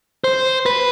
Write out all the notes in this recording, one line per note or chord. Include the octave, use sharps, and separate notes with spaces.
C5
B4